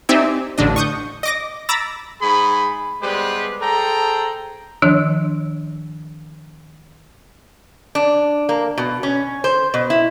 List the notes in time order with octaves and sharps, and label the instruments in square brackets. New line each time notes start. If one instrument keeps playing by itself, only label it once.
[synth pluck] C4 D#4 G4 D5 E5 G#5
A1 D3 D4 D#5
C#6 D#6 G6
D#5 D6 A#6
A#5 B5 D6 E6 A6 A#6
[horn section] G#2 G#4 G#5 B5
G3 G#3 B3 G4 B4 C5
G#4 A4 C5 G5 A#5
[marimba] D#3 F3 D4 C#5
[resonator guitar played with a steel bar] D4
A#3
B2
C#4
C5
B2
E4